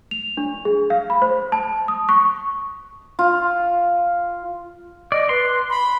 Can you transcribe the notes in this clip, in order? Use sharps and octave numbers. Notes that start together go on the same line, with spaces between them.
F7
D4
G#4
F5
B5
C5
A5
D#6
C#6
F4
D5 D#5
B4 C6
B5